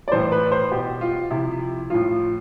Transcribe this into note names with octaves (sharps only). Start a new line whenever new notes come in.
D5
A2 E3 C5
B4
C5
B2 G4
F4
C3 F3 E4
A2 F3 F4